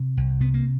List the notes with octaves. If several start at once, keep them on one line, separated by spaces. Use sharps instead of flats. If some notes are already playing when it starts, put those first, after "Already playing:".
Already playing: C3
C2
C3 B3
A#3